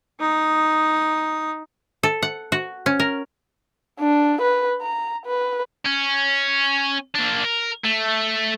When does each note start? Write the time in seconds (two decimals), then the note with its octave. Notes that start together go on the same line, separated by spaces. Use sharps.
0.20 D#4 D#6
2.03 A4
2.22 F#5
2.52 F#4
2.86 C#4
2.99 A#4
4.00 D4
4.42 B4
4.82 A#5
5.26 B4
5.86 C#4
7.15 A#3 D4
7.44 A#4
7.85 A3